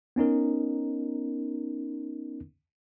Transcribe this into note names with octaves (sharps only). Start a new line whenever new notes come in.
B3 C#4 D#4 A#4